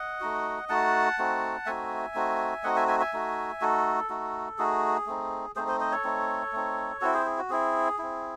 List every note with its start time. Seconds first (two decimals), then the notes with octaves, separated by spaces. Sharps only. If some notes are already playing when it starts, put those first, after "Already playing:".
Already playing: D#5 F#5
0.20 A3 D#4 F#4
0.69 A3 D#4 F#4 F#5 A5
1.18 A3 C4 D#4 F#4
1.66 A3 C4 D#4 F#4 E5 G#5
2.15 A3 C4 D#4 F#4
2.63 A3 C4 D#4 F#4 D#5 F#5
2.76 E5 G#5
2.88 E5 G#5
3.00 E5 G#5
3.13 A3 D#4 F#4
3.61 A3 D#4 F#4 A4
4.10 A3 D#4 F#4
4.58 A3 D#4 F#4 G#4
5.06 A3 C4 D#4
5.56 A3 C4 D#4 G#4 C5
5.68 C5 D#5
5.80 C5 D#5
5.92 A4 C#5
6.04 A3 C4 D#4
6.53 A3 C4 D#4
7.01 C4 E4 F#4 A4
7.14 G#4 C5
7.26 G#4
7.38 F#4
7.50 C4 E4 G#4
7.99 C4 E4